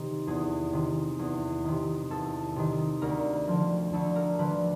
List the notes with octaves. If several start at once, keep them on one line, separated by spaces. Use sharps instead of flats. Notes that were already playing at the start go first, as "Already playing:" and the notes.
Already playing: C3 D#3 G4
E2 G#4
C3 D#3
E2
C3 D#3
E2 A4
C3 D#3
D2 A#4
D3 F3
D2 A4
A#4
D3 F3 B4